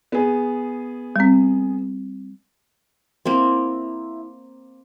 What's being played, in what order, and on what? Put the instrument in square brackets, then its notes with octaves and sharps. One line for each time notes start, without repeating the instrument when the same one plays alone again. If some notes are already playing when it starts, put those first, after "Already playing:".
[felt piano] B3 G#4
[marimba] G3 C4
[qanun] A#3 C4 [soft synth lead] E4